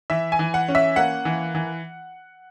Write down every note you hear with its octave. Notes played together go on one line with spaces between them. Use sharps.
E3 E5
G#5
E3
F#5
C#4
E5
A#3 F#5
E3
E3